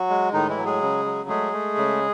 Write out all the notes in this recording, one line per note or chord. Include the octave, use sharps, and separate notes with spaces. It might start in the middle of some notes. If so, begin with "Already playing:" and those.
Already playing: F#3 F#4
G#3
A2 D#3 D#4
E3 E4
F#3
G#3 G#4
C#3
F#3
G#3 A3 G#4
A3
C#3